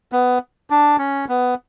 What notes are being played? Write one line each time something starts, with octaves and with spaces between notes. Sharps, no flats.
B3
D4
C#4
B3